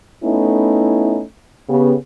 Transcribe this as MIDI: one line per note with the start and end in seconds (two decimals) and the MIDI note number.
0.24 1.22 57
0.24 1.22 59
0.24 1.22 61
0.24 1.22 63
0.24 1.22 64
1.69 1.94 49
1.69 1.94 59
1.69 1.94 67